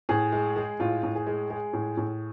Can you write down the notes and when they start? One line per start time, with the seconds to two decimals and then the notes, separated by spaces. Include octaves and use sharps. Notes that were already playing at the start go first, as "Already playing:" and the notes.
0.09 A2 G#4
0.32 G#3
0.56 G#3
0.80 A2 F4
1.03 A2
1.15 G#4
1.27 G#3
1.50 G#3
1.73 A2
1.97 A2